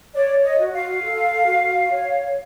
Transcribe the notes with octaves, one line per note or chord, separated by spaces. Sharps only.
C#5 D5
D#5
F#4
F5
A4
F#4
C#5